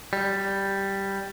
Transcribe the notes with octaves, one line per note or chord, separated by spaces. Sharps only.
G3